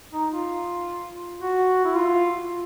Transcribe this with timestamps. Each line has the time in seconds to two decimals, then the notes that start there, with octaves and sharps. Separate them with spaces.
0.13 D#4
0.31 F4
1.42 F#4
1.85 E4
1.96 F4